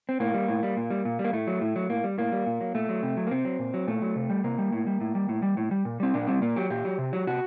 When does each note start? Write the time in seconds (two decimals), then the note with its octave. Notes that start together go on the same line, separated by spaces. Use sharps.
0.09 C4
0.20 A2 A#3
0.34 G3
0.48 A2
0.63 G3
0.77 A#2
0.91 G3
1.05 A#2
1.19 G3
1.24 A#3
1.33 A2 A3
1.47 F#3
1.61 A2
1.76 F#3
1.90 A2 A#3
2.04 G3
2.18 A2 A#3
2.32 G3
2.47 A#2
2.61 F#3
2.74 A#2 A3
2.89 F#3
3.03 C3
3.17 F#3
3.27 A#3
3.31 C3 C4
3.45 F#3
3.59 A#2
3.74 F#3
3.88 A#2 A3
4.02 F#3
4.16 C3
4.30 G3
4.44 C3 A#3
4.58 G3
4.72 A2
4.87 G3
5.01 A2
5.15 G3
5.29 A2
5.43 G3
5.57 A2
5.71 G3
5.85 A#2
6.00 G3 C4
6.14 A#2 D4
6.27 G3 C4
6.42 A#2 A#3
6.56 F#3 G4
6.70 A#2 G4
6.85 F#3
6.99 C3
7.13 F#3
7.27 C3 F#4